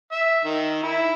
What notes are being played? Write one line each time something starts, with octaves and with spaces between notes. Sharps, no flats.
E5
D#3
E4